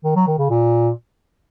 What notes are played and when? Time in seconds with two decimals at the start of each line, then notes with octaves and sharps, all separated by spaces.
0.04 D#3
0.16 F#3
0.27 D#3
0.39 C#3
0.50 A#2